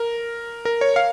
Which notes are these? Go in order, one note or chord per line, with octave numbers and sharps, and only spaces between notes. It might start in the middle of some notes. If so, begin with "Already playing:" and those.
Already playing: A#4
A#4
C#5
F5